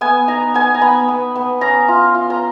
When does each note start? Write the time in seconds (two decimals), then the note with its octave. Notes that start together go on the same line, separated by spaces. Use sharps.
0.01 B3 G#5
0.28 D#4 A#5
0.54 B3 G#5
0.75 A#5
0.81 B3 B5
1.08 B3
1.35 B3
1.61 C#4 A#5
1.88 F4
2.15 F4
2.30 A#5